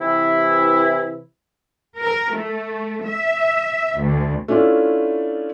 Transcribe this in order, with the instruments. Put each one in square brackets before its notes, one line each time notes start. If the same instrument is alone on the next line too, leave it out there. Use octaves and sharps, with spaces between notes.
[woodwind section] C3 E3 E4
[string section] A#4
A3
E5
D2
[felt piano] A3 C#4 D4 E4 F4 A4